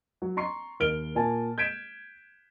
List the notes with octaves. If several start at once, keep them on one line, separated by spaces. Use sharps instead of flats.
F#3
A#5 C6 C#6 C7
D#2 A#3 F6 D7 G7
A#2 G#5 A5
G6 G#6 B6 D7 E7